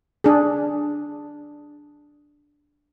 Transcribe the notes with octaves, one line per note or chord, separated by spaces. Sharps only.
D4 G#4